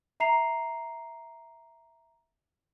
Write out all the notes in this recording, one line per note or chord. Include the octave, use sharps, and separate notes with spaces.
E5 A#5 C7 F7